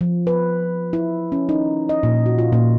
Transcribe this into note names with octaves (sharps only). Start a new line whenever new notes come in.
F3
B4
E4
C#4
D#4
D#5
A#2
F#4
F4
A#2